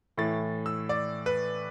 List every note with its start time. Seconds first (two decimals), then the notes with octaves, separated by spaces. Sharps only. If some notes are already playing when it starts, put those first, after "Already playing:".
0.18 A2 E3 A3 A6
0.66 E6
0.89 D5
1.26 B4